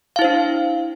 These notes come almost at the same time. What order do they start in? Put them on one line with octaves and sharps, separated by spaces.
F5 E4 C5 D4